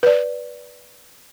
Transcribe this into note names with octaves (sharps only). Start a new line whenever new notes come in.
B4 D5